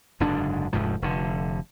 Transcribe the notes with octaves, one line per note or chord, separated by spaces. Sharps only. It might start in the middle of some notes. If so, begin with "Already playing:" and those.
F#1 G#2 D3 D4
F1 D2 G#2 F3
F1 D3